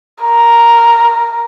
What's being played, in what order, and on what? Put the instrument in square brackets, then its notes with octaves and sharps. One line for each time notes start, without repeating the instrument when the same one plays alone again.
[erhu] A#4